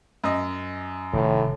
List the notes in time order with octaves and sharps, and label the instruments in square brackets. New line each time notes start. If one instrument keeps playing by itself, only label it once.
[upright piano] F#2 D#5
[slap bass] F1 D#3 [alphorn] A2